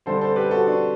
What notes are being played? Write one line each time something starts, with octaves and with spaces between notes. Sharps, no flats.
D3 G3 C4 A4 C5
A4 C5
G4 B4
F#4 A4
D4 F#4